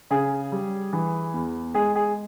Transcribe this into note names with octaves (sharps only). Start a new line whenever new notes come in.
C#3 G#4
G3
E3
E2
G#3 G#4
G#4